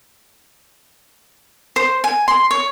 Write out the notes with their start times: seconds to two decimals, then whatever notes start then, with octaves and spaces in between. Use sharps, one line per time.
1.76 C5
2.04 G#5
2.28 C6
2.51 C#5